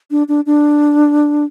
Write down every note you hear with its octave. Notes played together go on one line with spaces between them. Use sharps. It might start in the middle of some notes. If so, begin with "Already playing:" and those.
D4
D4
D4